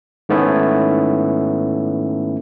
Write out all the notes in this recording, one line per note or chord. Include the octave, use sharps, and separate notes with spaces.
G#2 D#3 A3 B3 C#4 E4